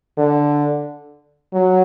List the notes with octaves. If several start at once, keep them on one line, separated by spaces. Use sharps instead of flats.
D3
F#3